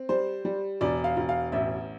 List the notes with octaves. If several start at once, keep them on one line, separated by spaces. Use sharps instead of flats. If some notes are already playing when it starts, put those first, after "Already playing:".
Already playing: C4
G3 C5
G3
E1 D5
F5
E1
F5
A1 E5